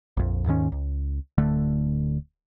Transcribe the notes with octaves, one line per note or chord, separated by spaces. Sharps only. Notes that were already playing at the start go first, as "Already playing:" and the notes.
A#1 F2
D#2 G#2 D#3 C#4
C#2
D1 D3 A3